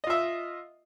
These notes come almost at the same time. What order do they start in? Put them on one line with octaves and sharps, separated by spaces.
D#5 F4 E5